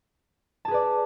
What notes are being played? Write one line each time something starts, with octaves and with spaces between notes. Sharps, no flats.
G#4 B4 D5 A5